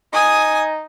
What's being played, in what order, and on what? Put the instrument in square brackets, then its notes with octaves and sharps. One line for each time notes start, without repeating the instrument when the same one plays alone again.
[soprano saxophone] D#4 [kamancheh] G#5 D#6